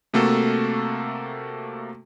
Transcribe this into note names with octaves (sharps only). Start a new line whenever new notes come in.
C3 A3 A#3 F#4 A4